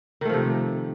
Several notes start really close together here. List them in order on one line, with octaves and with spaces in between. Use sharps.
D#3 A3 F3 C3